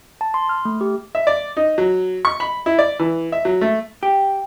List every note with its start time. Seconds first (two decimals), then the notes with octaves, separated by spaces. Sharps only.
0.21 A5
0.34 C6
0.49 F6
0.65 A3
0.81 G4
1.15 E5
1.27 D5
1.57 D#4
1.78 F#3
2.25 C#6
2.40 B5
2.66 E4
2.79 D5
2.99 E3
3.32 E5
3.45 F#3
3.61 A3
4.03 G4